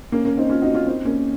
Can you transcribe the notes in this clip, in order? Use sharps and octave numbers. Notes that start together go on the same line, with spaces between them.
A#3 C#4
A#3 C#4
C4 D#4
C#4 F4
D#4 F#4
C#4 F4
C4 D#4
A#3 C#4